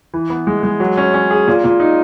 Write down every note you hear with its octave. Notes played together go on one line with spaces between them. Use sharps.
E3
B3
G#3
G#3
F#3
C#4
C#4
G#4
A#2
A#2
D#4